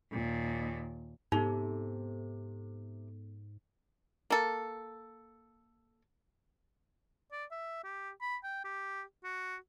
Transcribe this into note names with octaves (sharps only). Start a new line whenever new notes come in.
D#2 A#2
G#2 C3 B3 D#4 A4
A#3 A4
D5
E5
G4
B5
G5
G4
F#4